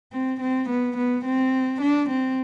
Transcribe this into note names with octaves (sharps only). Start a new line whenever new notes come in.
C4
C4
B3
B3
C4
D4
C4